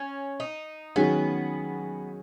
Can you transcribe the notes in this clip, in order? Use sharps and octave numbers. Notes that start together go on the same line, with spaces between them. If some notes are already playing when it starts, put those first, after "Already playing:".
Already playing: C#4
D#4
D#3 F#3 B3 C#4 G#4